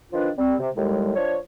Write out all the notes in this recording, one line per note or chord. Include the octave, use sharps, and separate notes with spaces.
D#3 F3 D4 F4 B4
G3 C4
C3
D#2 A2 G3 G#3
F3 D4 C#5